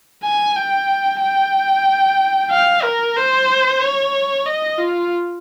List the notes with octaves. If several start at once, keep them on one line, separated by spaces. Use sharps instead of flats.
G#5
G5
G5
F5
A#4
C5
C#5
D#5
F4